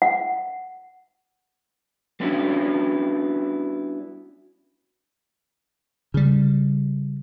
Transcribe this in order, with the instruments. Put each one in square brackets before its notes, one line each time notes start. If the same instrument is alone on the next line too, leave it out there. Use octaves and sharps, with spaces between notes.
[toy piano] F#5
[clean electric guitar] G3 B3 C#4 D4 E4 F#4
[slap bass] C#3 G3